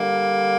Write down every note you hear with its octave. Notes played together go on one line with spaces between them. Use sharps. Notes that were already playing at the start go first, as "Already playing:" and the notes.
Already playing: D3 G3 A#3